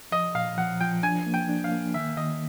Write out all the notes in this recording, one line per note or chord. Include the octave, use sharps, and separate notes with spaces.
F3 D#5
A#2 F5
F3 F#5
F3 G5
D4 G#5
A#3
G5
D4
F5
A#3
D#3 E5
D#3 D#5